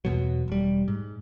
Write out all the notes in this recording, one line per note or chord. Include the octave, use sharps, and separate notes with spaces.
E2 B2 F#3
E1 G3
G#2